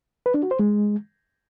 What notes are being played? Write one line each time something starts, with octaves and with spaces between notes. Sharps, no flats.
B4
D4
F#4
C5
G#3